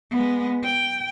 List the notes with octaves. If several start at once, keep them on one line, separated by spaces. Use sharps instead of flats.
G#3 B3
G5